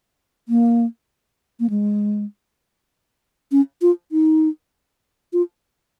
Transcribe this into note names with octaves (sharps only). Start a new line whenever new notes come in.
A#3
A#3
G#3
C#4
F4
D#4
F4